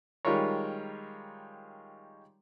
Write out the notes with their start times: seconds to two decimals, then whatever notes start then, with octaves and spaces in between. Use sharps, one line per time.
0.25 D#3 G3 G#3 F4 A#4 C#5